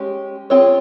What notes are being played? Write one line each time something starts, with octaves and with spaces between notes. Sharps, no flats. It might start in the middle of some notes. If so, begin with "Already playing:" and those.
Already playing: G#3 C#4 G4
C4 F4 G#4 C#5